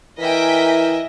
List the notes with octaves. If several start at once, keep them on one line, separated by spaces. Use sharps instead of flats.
E3 E4 A#4 D#5 E5 G5 G#5 B6